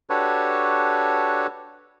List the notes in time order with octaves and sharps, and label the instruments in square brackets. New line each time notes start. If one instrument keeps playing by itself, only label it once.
[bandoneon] D4 F#4 G4 A4 B4 C#5